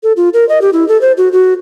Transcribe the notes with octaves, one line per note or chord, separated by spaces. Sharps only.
A4
F4
A#4
D#5
G4
E4
A4
C5
F#4
F#4